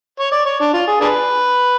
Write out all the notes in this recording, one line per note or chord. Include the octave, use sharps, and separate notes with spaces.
C#5
D5
C#5
D4
F4
G#4
D4 G#4 B4